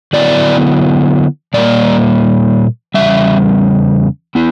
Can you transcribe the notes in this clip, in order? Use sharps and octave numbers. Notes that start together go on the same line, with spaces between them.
D3 F#3 B3 E4 D5
A#2 G3 A#3 D5
E2 C#3 G3 E5
B3 E4